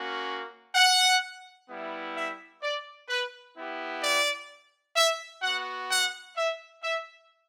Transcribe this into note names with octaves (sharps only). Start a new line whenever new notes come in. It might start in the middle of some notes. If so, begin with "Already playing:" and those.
Already playing: A#3 C#4 F#4
F#5
G3 B3 E4
E5
D5
B4
B3 E4 G4
D5
E5
B3 F#4 F#5
F#5
E5
E5